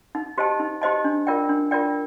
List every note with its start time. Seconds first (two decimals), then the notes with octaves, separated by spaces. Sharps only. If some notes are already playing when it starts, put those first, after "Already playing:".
0.15 D#4
0.38 G4 C5 D#5 A5
0.60 D#4
0.81 G4 C5 D#5 A5
1.04 D4
1.27 F4 A#4 D5 G5
1.49 D4
1.71 F4 A#4 D5 G5